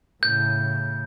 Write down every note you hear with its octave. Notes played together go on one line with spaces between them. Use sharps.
A2 C#3 G6